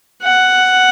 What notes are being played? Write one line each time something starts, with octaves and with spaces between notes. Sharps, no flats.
F#5